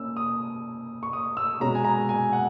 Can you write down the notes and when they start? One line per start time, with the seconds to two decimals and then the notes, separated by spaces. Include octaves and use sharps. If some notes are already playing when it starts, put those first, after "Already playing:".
Already playing: A#2 A#3 C#4 E6
0.17 D#6
1.03 C#6
1.13 D#6
1.37 E6
1.60 B2 G#3 C#4 A#5
1.75 G#5
1.84 A#5
2.09 G#5
2.33 F#5